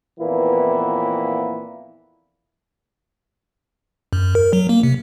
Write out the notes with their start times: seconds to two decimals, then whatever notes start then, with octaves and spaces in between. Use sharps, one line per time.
0.20 F2 A#2 E3 A#3 B3 E4
4.13 F#2
4.35 A#4
4.53 F#3
4.69 A#3
4.83 C3